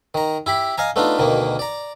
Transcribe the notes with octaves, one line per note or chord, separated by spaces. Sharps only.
D#3 A#5
E4 G4 B5
D#5 F5 G#5 A#5
A3 B3 D4 D#4 F4
D2 B2 D#3 A#3
D5 A#5